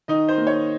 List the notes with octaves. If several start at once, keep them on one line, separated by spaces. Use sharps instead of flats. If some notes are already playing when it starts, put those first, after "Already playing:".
D#3 D#4 D#5
C5
A#3
C#5